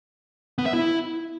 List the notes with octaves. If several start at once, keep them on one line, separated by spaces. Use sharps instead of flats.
B3
E5
E4